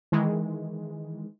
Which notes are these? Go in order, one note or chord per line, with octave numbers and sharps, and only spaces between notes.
D#3 E3 G#3